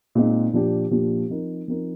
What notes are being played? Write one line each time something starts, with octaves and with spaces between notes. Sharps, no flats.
A#2 G#3 C4 D#4
A#2 F3 A#3 D4 G4
A#2 F3 A#3 D4 G4
F3 C4 D#4 A#4
F3 C4 D#4 A#4